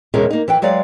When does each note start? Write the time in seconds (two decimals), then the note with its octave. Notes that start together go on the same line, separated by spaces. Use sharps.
0.14 E2 B2 D3 G#3 C#4 A#4
0.30 A#3 D#4
0.48 E3 B4 G5
0.62 F#3 G#3 B4 D5 F5